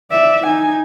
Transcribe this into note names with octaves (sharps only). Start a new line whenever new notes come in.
D5 E5
D#4 G#5